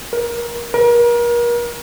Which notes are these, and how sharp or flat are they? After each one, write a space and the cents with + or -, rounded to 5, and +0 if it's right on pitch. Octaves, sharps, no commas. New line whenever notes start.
A#4 +25
A#4 +35